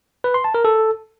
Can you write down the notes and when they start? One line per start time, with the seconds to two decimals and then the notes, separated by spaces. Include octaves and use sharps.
0.24 B4
0.34 C6
0.44 A5
0.54 A#4
0.65 A4